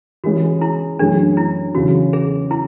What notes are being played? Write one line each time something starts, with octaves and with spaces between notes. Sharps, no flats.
E3 G#3 C#4 F#4 G#4
E4
F#2 E3 A3 C#4 D4 G#4
E4
E2 C#3 F#3 C#4 F#4
G#4
E4